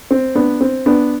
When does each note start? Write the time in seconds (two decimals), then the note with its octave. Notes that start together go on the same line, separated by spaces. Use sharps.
0.11 C4
0.35 B3 D4
0.61 C4
0.86 B3 D4